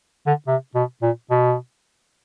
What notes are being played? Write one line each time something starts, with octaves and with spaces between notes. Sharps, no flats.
D3
C3
B2
A#2
B2